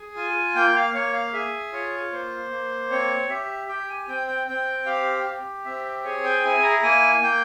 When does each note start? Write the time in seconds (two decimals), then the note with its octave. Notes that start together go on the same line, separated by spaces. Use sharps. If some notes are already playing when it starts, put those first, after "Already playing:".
Already playing: G#4
0.15 F4 G#5
0.55 A#3 G5
0.75 F5
0.94 A#3 C#5
1.13 F5
1.33 G#4 E5
1.72 F4 C#5
2.12 A#3 C5
2.51 A#3
2.90 C4 C#5
3.30 G4 E5
3.68 G4 G5
3.89 G#5
4.08 C4 G5
4.27 G5
4.47 C4 G5
4.86 G4 F5
5.26 G4
5.65 C4 E5
6.04 G#4 C#5
6.24 G5
6.43 E4 G#5
6.63 A#5
6.83 A#3 G#5
7.22 A#3 G5